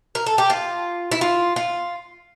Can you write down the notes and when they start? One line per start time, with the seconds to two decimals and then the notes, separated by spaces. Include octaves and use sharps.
0.15 A#4
0.26 A4
0.38 G4
0.50 F4
1.12 E4
1.21 F4
1.56 F4